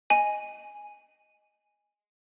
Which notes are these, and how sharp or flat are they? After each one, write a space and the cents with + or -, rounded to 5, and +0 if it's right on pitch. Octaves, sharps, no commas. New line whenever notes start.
D#5 +0 G#5 +0